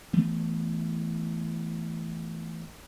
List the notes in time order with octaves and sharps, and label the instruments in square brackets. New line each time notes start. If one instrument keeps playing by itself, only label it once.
[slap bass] E3 A3 B3